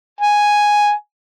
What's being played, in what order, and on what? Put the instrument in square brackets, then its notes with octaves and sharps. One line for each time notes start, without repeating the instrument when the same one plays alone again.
[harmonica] G#5